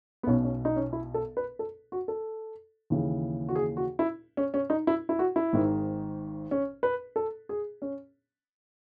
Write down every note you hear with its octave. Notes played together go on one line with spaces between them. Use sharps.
B3
B1 B2 C#4
C#4
D#4
C#4
E4
A4
B4
A4
F#4
A4
D#2 C#3 E3
F#4
G#4
F#4
E4
C#4
C#4
D#4
E4
E4
F#4
E4
G#1 G#2 D#3
C#4
B4
A4
G#4
C#4